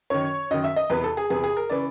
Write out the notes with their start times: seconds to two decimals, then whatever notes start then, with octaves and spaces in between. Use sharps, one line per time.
0.10 F#2 D#3 C#5
0.51 F#2 D#3 D#5
0.64 E5
0.76 D#5
0.90 E2 C3 E3 B4
1.04 A4
1.17 G#4
1.30 E2 C3 E3 G#4
1.44 G#4
1.57 A#4
1.70 C#3 E3 D5